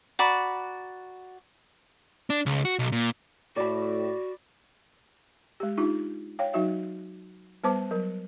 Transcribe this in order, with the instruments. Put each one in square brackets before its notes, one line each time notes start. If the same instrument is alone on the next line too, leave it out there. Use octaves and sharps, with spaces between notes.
[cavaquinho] F#4 D5 A#5 B5
[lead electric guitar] D4
C#2
F#4
B1
A#2
[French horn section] A2 [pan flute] F#4 [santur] D5 B5
[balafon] G#3 G4
D4 D#4 F4 G4
C#5 F5 G5
F#3 D#4 F#4 E5
G3 B3 B4 C5 A5 D6
F#3 A#4